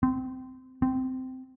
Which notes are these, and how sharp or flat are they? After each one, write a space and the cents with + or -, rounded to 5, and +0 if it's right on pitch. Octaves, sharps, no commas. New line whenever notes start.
C4 -25
C4 -15